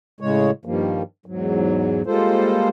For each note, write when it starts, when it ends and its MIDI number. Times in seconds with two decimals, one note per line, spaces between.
0.20 0.51 45
0.20 0.51 49
0.20 0.51 56
0.20 0.51 73
0.65 1.03 43
0.65 1.03 51
0.65 1.03 53
0.65 1.03 55
0.65 1.03 58
1.26 2.02 40
1.26 2.02 44
1.26 2.02 54
2.06 2.69 55
2.06 2.69 56
2.06 2.69 58
2.06 2.69 65
2.06 2.69 69
2.06 2.69 72